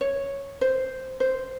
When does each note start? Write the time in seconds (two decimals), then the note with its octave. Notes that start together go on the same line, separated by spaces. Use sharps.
0.01 C#5
0.61 C5
1.20 C5